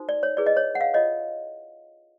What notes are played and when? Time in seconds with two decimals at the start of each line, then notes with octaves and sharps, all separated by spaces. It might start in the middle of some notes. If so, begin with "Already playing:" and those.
Already playing: D#4 F#4 A4 C5
0.09 D5
0.23 C#5
0.37 E4 G#4 B4 D5
0.46 D#5
0.57 C#5
0.75 F#5
0.81 F5
0.94 F4 A4 C#5 D#5